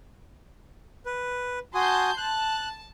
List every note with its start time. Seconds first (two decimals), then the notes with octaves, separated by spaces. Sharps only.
1.06 B4
1.75 F#4 G#5 A5 C6 D#6 G6
2.17 A5 F#6